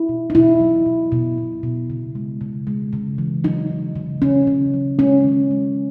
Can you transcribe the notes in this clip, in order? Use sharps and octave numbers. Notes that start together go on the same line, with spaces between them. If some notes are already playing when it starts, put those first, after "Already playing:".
Already playing: E4
B2
D#4
B2 E4
F#3
B2
B2
B2
B2
C#3
G#3
C#3
G#3
C#3
E3
F#3 D#4
C#3
C#3
C#3 C#4
C#3
F#3
G#3 C#4
D#3
G#3